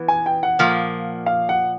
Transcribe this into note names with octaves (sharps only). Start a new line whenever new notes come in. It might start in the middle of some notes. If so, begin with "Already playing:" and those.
Already playing: E3 B3
G#5
G5
F#5
A#2 F3 A#3
F5
F#5